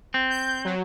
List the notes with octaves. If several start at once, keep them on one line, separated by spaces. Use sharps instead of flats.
C4
G6
F#3